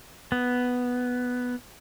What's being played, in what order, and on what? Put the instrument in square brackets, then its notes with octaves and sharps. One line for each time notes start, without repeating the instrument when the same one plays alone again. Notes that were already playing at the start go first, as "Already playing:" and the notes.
[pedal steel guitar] B3